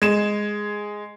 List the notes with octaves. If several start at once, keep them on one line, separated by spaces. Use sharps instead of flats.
G#3 E7